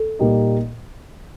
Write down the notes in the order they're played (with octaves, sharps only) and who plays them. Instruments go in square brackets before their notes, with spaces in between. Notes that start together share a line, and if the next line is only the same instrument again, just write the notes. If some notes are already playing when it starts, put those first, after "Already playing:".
Already playing: [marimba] A4
[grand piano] A#2 G3 A#3 D#4